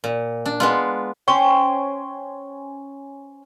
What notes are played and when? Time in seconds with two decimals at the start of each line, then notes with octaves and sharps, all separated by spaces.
0.04 A#2
0.46 D4
0.60 G#3 B3 F4
1.28 C#4 C5 G5